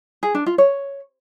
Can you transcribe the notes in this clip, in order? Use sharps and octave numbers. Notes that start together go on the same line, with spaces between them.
G#4
D4
F4
C#5